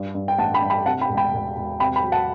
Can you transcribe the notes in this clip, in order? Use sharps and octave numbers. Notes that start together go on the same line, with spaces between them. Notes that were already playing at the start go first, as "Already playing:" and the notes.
Already playing: G2
G2
G5
A1 F#5 A5
G5 B5
G2
G5 B5
C3 F#5 A5
G5 B5
E1
G5 B5
E1
E1
C3 G5 B5
G5 B5
F#3
F#5 A5